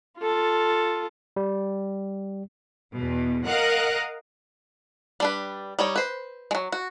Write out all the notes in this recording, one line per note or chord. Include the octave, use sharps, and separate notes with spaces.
F4 A4
G3
E2 B2
A#4 D#5 F5 F#5 F#6
G3 D4 B4
G3 D#4 C#5
B4 C5
F#3 G#3
F#4